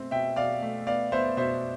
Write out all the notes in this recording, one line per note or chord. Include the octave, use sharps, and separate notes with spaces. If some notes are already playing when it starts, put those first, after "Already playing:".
Already playing: B2 A3 C4
B2 E5 G5
B2 D5 F5
A3
B3 D5 F5
B3 C5 E5
B2 C5 E5